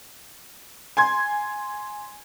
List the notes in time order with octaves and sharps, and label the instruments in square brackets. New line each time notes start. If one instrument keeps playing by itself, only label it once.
[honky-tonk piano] G#5 C6 G#6